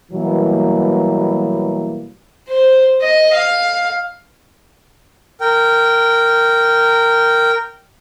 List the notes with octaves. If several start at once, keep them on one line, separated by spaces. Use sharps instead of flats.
B2 E3 F#3 G3 A#3
C5
D#5
F5
A#4 G5